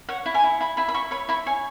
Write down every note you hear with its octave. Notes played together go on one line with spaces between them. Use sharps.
C#5 F#5
E4
G#5
E4
E4 B5
E4 B5
B5
E4 C#6
C#5 B5
E4 B5
C#5 G#5